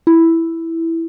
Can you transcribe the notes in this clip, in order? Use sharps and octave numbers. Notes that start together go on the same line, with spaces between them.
E4